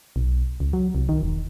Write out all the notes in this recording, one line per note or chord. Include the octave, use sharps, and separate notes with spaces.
B1
C#2
F#3
C2
D#3
E1